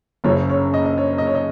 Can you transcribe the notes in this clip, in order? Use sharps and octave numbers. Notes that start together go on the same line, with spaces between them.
F#1 F#2 C#3 C#5
C#5
D#5
D#5
C#5
D#5
C#5
D#5